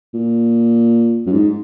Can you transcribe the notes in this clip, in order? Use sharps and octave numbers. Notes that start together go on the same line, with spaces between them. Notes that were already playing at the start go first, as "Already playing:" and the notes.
A#2
F#2
G#2